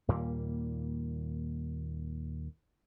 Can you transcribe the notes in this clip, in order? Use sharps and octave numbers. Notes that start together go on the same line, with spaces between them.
D#2 A#2 G3 A#3